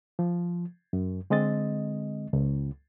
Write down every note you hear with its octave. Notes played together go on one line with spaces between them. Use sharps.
F3
F#2
D3 G#3 C4 D#5 A6
C#2